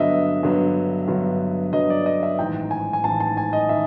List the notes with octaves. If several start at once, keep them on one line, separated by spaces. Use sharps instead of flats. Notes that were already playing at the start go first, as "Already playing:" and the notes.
Already playing: G2 D3 F#3 B3 D#5 E5
G2 D3 F#3 B3
G2 D3 F#3 B3
G2 D3 F#3 B3 D#5
D5
D#5
E5
A1 G#2 D#3 G5
G#5
G#5
A1 G#2 D#3 A5
A5
G#5
D#5
D#3 E5